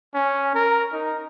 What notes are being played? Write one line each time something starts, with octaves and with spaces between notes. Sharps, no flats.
C#4
A#4
D#4